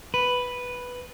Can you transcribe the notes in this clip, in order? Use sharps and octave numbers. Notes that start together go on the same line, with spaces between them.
B4